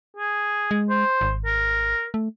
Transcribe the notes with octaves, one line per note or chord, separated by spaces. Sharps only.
G#4
G#3
C5
G#1
A#4
A3